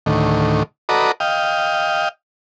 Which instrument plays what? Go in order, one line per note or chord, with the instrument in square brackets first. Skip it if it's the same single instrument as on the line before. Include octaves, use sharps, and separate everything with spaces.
[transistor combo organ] D2 A2 D#3
F#4 A4 B4 D5 D#5 A#5
D#5 F5 G5